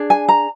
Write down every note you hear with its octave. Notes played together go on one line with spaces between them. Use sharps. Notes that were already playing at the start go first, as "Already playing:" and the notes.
Already playing: D4 G#4
G#5
A#5